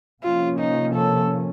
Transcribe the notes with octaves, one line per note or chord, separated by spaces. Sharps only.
C3 F3 A#3 C#4 F4
D#4
A4